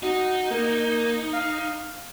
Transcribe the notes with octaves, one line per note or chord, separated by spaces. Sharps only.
D#4 F#4
A#3
F5